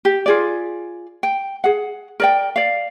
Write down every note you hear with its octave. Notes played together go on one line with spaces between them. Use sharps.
G4
F4 G#4 D5
G5
G#4 F#5
A#4 D5 G5
D5 F5